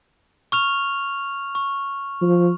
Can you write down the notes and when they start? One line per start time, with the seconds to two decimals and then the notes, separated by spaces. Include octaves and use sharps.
0.52 C#6 F6 F7
1.55 C#6
2.22 F3